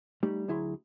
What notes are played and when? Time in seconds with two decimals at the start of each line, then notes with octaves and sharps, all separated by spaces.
0.23 G3 A3 D#4 G4
0.48 D2 F#3 E4 G#4 A#5 C6